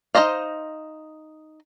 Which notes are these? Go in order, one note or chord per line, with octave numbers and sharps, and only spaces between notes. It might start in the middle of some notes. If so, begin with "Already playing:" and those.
D#4 B4 C5 D#5 F5